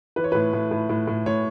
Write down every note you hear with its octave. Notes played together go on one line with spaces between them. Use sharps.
E3 B4
C#5
A2 B4
A2
A2
A2
A2
A2 C#5